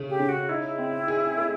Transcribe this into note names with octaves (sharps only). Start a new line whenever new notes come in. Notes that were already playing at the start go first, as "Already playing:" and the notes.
Already playing: C#3 A3
G4
C#3
F#4
D#4 E4
C4
G#4
A3